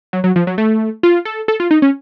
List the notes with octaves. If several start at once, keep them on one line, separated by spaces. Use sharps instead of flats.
F#3
F#3
F3
F#3
A3
F4
A4
A4
F4
D#4
C#4